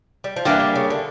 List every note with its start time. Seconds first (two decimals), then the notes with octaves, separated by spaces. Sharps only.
0.24 G3
0.36 F3
0.45 E3 G3 A#3 D4 G4
0.60 D3
0.75 C#3
0.90 D3